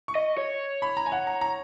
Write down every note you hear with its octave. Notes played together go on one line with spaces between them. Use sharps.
C#6
D#5
C#5
B5
A#5
G#5
F#5
A#5
A#5